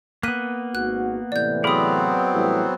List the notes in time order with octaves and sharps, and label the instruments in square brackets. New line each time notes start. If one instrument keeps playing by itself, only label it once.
[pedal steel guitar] A#3 B3 [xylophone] F#6 B6 D#7
[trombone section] G#1 F#4 [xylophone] F#6
[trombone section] A2 C3 E3 [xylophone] D5 G6
[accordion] F#3 B3 C4 [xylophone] G#4 D#6 [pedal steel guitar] D5 F5 B5
[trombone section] A2 E3 G3